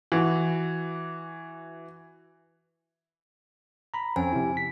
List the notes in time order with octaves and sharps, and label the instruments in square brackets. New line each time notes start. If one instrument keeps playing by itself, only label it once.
[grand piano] E3 F#4
[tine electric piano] A#5 B5
[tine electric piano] F2 C4 C#4 [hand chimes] G#5
[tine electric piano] C3 E4
B6